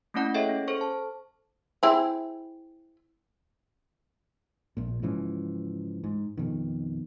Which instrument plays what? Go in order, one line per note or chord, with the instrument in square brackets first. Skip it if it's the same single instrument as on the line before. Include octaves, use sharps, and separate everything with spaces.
[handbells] A3 A#3 C#4 E4 D5 F#5
G#4 A4 C#5 D#5 E5 G5
C#4
A4 C5 C#6
A5
[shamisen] C4 E4 G#4
[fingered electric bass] A#1 A#2
G#2 C#3 E3 F3
G#2
F2 B2 D#3